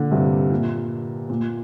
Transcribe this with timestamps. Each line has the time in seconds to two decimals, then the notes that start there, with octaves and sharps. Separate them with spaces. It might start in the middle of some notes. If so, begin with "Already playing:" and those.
Already playing: A#2 D3
0.11 G2 C3
0.51 A#2
1.30 A#2